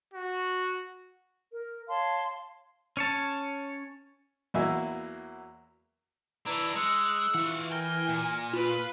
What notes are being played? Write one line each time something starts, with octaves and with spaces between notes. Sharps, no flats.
F#4
A#4
C#5 F5 A5 C6
C#4 C#5 A5
E2 F#3 A#3 E4 E5 G#5
E3 D4 E4 B4 A#5
G#3 E6 F#6 C#7
E3 F4 F#5
A#4 G5 G#5
A#2
F4 B4